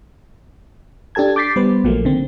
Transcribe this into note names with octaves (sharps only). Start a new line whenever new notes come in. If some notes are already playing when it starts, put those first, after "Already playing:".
D4 G4 A4 A5 G#6
D6 G6 A6 B6 C7
G3 B3 B4 C5
A#1 A#2 F3 F#3 A3 A#3
D3 D#3 C4